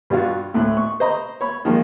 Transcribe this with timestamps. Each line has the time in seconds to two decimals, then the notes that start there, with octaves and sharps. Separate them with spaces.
0.10 G2 G3 D4 F4 F#4
0.54 D2 A2 F#6
0.77 C#6
1.00 C5 D#5 A#5 B5
1.41 C#5 B5
1.65 D#3 F3 G#3 A#3